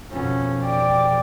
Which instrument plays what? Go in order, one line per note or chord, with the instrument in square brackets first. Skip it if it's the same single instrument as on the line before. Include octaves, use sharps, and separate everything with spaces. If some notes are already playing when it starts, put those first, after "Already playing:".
[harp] F2 B2 [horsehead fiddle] C#4
[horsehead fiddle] D5 G5